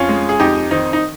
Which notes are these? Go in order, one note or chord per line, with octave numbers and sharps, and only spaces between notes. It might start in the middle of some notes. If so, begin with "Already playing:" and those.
Already playing: F2 C#4 F4
G#3
G#4
F2 D#4 G4
D#3 C4 D#4
D#4